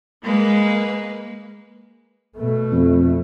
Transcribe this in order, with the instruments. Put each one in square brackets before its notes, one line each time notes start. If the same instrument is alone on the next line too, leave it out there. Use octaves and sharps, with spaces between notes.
[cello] G#3 [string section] A#3 B4
[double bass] B2 A3
[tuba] F2